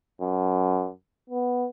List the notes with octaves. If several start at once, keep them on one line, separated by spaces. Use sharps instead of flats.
F#2
B3